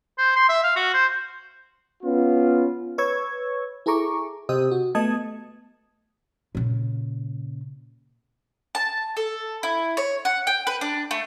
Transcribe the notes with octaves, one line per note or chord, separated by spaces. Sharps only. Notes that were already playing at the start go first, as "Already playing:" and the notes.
C5
C6
E5
F5
F#4
C5
B3 C#4 F4
B4 C#5 C#6 E6 G#6
E4 G#4 A4 A#5 C#6 D6
C3 G4 C5 D#5 D#6
F#4
A3 B3 D#5 A5 D#6 G#6
A#2 C#3
A5
A4
E4
C#5
F#5
G5
B4
D4
A3